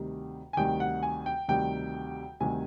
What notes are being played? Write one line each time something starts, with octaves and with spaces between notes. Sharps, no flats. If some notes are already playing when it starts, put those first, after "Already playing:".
Already playing: D2 C3 D#3 G3
G#5
D2 C3 D#3 G3 G5
F#5
G#5
G5
D2 C3 D#3 G3 G5
D2 C3 D#3 G3 G#5